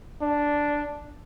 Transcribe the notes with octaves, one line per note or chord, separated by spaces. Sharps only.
D4